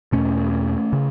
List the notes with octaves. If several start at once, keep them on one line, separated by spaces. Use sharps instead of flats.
E2 B2 A3 C#4
C#3